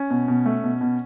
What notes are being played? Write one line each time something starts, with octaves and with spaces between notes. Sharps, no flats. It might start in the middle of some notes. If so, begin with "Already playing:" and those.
Already playing: C#4
B2
B2
A3
B2
B2